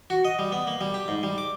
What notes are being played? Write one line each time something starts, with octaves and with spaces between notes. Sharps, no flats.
F#4
D#5
G3
B3
A#3
G3
G4
G#2
G3
D6